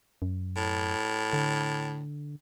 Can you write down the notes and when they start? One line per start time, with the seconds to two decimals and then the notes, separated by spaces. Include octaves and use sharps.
0.22 F#2
0.56 A2
1.33 D3